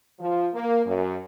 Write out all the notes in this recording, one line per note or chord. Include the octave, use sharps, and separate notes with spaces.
F3
A#3
F#2